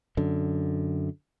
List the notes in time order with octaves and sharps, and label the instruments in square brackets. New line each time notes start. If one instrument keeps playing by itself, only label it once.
[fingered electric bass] F#2 D3